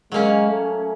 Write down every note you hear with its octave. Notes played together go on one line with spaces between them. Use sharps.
F#3 G#3 A#3 C#4
A3